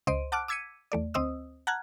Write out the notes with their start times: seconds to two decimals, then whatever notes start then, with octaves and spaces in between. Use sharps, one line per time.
0.07 C#2 C5 D#5 C6 D7 D#7
0.32 F#5 A5 D6 F6 F#6 D7
0.48 D6 E6 G#6 B6 C#7 D#7
0.92 E2 A3 D5
1.14 D2 C4 C5 D#5 D#6 E6
1.67 F#5 A5 A#5 F6 F#6 G#6